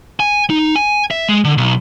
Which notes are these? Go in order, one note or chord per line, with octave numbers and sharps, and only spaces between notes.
G#5
D#4
G#5
E5
G#3
D3
B1